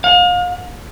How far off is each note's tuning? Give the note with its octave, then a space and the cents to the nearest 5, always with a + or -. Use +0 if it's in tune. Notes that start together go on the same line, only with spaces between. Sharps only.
F5 +35